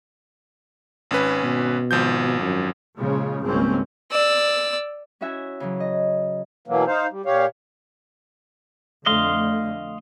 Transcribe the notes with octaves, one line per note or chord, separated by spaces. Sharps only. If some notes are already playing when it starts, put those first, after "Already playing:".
G#1 C#4 B4
B2
G#1 F3 G6
F#2
A#2 C#3 F3 G#3
G#1 C#2 G3 A#3 C4 C#4
D5 E6
C#4 E4 F#4 E5 G#5
C#3 E3 F#3
D#5
B2 E3 F#3 A#3
D#4 C5 F5
G3
A#2 G4 C#5 F5
F2 D3 A3 D#5 F5 C6